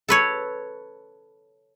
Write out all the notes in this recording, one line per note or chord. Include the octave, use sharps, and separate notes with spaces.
A4 B4 C#5